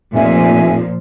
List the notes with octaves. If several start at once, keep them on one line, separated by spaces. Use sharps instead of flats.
F1 A#2 F3 E5 G#5